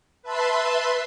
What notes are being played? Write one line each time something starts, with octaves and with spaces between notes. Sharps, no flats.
B4 E5 A5 B5 C6